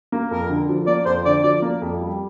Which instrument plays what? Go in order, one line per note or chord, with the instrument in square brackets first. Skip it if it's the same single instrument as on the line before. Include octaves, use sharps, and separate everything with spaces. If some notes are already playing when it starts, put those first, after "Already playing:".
[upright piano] A#3
[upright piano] F2 [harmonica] A#4
[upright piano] D3
F3
[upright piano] A#3 [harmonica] D5
[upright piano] F2 [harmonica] C5
[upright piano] D3 [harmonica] D5
[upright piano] F3 [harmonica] D5
[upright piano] A#3
F2
G3